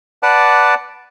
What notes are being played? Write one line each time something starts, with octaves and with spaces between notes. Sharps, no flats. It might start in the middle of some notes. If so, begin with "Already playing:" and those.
B4 D5 F#5 A5 D6